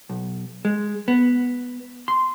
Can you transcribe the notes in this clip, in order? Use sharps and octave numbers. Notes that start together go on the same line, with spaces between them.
B1
G#3
B3
C6